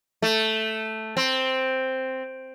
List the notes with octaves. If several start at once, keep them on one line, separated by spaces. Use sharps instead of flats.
A3
C4